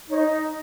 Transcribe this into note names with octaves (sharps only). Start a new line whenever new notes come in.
D#4 C#5
D#5